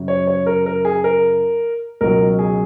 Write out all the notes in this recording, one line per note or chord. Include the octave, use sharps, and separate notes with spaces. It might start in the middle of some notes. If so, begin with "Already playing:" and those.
Already playing: F#2 C#3 F#3
C#5
C#5
A#4
A#4
G#4
A#4
C#2 B2 F#3 A#4
G#4